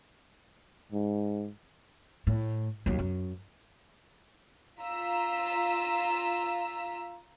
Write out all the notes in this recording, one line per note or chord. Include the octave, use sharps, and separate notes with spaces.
G#2
A2
D#2 F#3
F#2
F4 A#5 E6 B6